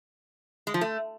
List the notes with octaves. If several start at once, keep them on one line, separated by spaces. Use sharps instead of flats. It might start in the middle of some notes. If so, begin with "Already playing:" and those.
G#3
F3
A3